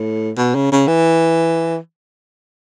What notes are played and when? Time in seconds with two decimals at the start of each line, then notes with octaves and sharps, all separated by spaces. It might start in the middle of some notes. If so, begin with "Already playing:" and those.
Already playing: A2
0.37 B2
0.55 C#3
0.72 C#3
0.87 E3